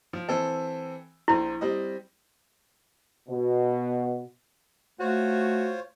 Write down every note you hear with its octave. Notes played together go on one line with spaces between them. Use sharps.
F3
E3 C4 A4
A#1 E4 C5
G3 C4 D#5
B2
A3 F4 F#4 C5 C#5